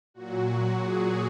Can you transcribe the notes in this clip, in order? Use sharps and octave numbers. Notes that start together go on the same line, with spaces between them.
A#2 F#3 F#4
G#4